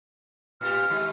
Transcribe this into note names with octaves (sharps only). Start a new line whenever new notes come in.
A2 F4 G4 F6
D#3 G#3